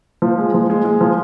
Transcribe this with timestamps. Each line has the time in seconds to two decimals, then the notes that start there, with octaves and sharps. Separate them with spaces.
0.22 F3
0.38 G#3
0.54 F3
0.70 G#3
0.85 G#3
1.01 F3